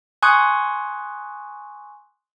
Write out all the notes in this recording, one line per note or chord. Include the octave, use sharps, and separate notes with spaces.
G#5 C6 C#6 D#6 F#6